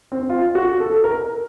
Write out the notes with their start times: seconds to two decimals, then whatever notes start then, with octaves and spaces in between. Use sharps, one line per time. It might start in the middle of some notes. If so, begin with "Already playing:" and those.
0.12 C4
0.30 F4
0.55 F#4
0.80 A4
1.04 A#4